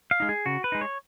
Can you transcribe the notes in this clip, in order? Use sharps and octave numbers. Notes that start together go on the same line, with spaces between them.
F5
G#3 D#4
G#4
C#3 F#4
B4
G#3 D#4
C#5